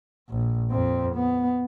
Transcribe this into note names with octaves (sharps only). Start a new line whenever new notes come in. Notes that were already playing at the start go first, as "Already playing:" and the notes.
A#1
F2 C4
B3